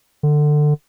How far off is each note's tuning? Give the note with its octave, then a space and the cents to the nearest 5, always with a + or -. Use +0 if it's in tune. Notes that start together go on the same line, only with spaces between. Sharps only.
D3 +20